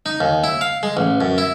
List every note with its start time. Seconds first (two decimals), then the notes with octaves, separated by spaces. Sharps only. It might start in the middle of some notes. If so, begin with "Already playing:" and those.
0.06 D#4
0.21 D#2
0.44 E4
0.61 F5
0.83 G#3
0.97 A1
1.21 F#2
1.38 E4